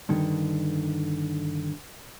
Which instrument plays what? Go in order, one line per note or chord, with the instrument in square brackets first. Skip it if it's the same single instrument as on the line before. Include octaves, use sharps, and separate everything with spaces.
[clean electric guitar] G2 D3 D#3